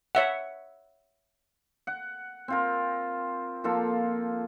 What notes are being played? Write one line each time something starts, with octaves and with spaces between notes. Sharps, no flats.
C#5 E5 F#5
F#5
C4 F4 A#4
F3 A#3 F4 A4